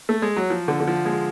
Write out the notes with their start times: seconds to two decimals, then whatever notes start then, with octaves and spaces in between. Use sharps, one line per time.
0.09 A3
0.22 G#3
0.37 F#3
0.50 F3
0.68 D3
0.80 D3
0.87 F3
1.06 G#3